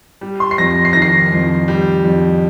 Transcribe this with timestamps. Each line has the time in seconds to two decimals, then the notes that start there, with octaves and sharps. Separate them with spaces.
0.21 G3
0.40 C6
0.51 C7
0.58 F2 A#6
0.85 C7
0.93 D#3 A#6
1.02 C7
1.32 F2
1.68 G3
2.05 F2